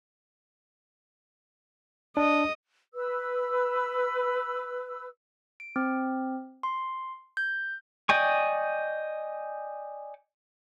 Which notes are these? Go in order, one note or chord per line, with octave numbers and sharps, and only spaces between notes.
D4 D#5
B4 E6
D7
C4
C6
G6
D5 D#5 G5 G#5 C#6